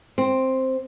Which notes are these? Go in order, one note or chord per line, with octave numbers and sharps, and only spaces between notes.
C4